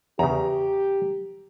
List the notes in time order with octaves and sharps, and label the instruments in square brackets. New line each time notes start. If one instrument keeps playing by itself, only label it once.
[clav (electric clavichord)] E2 C#3 [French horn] G4 [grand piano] A#5